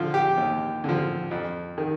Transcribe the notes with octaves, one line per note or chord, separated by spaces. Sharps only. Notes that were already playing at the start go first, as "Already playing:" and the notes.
Already playing: D3 F3 F4
G4
D#2
D3 F3
F2
D#3